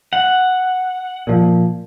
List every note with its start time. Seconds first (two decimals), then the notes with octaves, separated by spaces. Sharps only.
0.13 F#5
1.27 A#2 F3